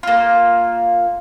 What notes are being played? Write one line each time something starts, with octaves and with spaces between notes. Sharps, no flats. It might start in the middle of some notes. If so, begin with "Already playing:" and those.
A#3 F4